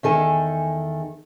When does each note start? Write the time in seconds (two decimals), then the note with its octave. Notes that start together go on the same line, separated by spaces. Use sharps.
0.03 E2 D#3 A4 G#5